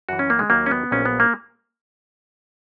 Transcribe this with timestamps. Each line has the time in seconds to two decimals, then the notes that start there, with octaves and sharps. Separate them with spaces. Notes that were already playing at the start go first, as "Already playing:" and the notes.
0.09 F#2 E3 F#4
0.19 C#4
0.30 A#3
0.39 G#3
0.50 D#2 D#3 F#3 A#3
0.66 C#4
0.71 B3
0.91 A#1 A#2 F#3 C#4
1.05 B3
1.20 A#3